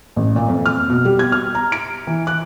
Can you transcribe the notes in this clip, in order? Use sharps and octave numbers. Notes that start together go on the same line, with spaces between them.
A1
A#2
F2
F6
B2
G3
G#6
F6
A#5
D7
E3
F#6